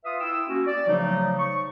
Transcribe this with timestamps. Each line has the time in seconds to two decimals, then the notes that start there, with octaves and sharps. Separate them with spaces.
0.05 F4 B4 E5 F5 D#6
0.21 E4 G5 E6
0.48 A#3 C#4 F#4
0.67 D5
0.88 C#3 F3 F#3 A3 D#4
1.39 C#6